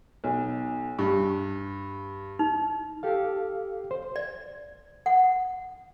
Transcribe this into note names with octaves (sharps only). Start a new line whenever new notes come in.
B1
G2 C#6
D#4
G4 A4 F5
C5
D5
F#5